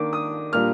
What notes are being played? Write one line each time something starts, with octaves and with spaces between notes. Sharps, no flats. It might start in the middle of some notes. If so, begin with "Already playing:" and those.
Already playing: D#3 A#3 D4 D6
D#6
A#2 G3 A#3 D4 F6